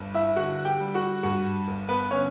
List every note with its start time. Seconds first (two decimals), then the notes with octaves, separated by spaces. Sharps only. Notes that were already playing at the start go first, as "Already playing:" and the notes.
Already playing: G1 G2
0.14 E4 E5
0.36 D3 F#4 F#5
0.65 G4 G5
0.80 G3
0.94 F#4 F#5
1.23 G2 F#4 F#5
1.68 G1
1.89 B3 B4
2.11 D3 C#4 C#5